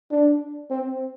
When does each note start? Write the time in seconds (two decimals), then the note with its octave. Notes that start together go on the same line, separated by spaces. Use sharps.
0.11 D4
0.70 C4